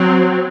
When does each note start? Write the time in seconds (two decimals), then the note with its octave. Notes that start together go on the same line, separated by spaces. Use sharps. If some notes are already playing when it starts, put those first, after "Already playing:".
Already playing: F#3 C4